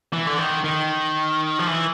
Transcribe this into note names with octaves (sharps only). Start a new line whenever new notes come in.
E3
D3
D#3
D#3
F3
E3